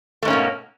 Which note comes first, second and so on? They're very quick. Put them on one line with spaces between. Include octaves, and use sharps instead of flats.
A3 G#2 C#4 A#3 B2